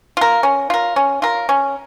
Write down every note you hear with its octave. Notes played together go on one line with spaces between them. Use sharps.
F4 A#4
C#4
F4 A#4
C#4
F4 A#4
C#4